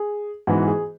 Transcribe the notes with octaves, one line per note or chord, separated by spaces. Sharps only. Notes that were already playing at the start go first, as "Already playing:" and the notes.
Already playing: G#4
G#2 E3 B3 F#4
G#4